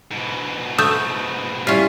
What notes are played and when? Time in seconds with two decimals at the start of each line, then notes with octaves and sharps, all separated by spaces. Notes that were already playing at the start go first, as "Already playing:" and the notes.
0.11 G#2 B2
0.78 A3 E5 D#6 G6
1.67 G3 C#4 E4 F4